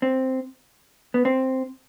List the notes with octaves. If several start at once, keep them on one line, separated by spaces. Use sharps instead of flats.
C4
B3
C4